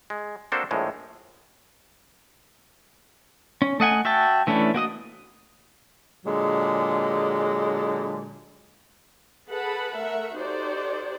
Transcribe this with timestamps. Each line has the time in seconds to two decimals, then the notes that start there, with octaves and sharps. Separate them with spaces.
0.10 G#3
0.52 A#3 C4 D4 F#4 A4 C5
0.71 A#1 A2 G#3
3.62 C#4
3.80 A3 D#5 F#5 G#5
4.05 F#4 E5 G5 A5
4.47 E3 A3 C#4 D4 E4
4.74 A#3 F#4 D#5 D#6
6.26 A#2 D3 F#3 G#3
9.48 G#4 A4 B4 F#5 A5 B5
9.95 A3 A#4 E5 F#5
10.36 D#4 F#4 G4 A4 C5 D5